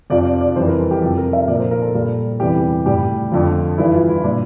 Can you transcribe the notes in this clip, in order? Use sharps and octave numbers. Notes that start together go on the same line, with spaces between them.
F2 C3 F3 D5
D5
D5
F2 E3 G3 C5
A#4
A4
G4
F2 C3 F3 A4
A#4
E5
A#2 F3 D5
A#4
C5
A#4
A4
A#2 G3
E2 C3 E3 G3 G4
A2 G3 G4
F2 D3 F3
G2 E3 G3 E4
F4
E4
A#2 G3 D4